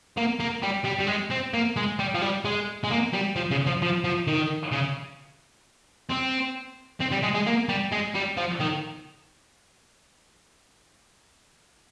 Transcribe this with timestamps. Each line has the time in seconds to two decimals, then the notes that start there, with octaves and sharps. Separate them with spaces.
0.17 A#3
0.40 A#3
0.63 G3
0.85 G3
1.00 G3
1.08 G#3
1.31 C4
1.54 A#3
1.77 G#3
1.99 G3
2.14 F3
2.22 G3
2.45 G#3
2.84 G#3
2.90 A#3
3.13 G3
3.36 F3
3.51 C#3
3.67 F3
3.82 F3
4.04 F3
4.27 D#3
4.72 C#3
6.10 C4
7.00 C4
7.12 G3
7.23 G#3
7.34 G#3
7.46 A#3
7.69 G3
7.92 G#3
8.15 G3
8.37 F3
8.60 D#3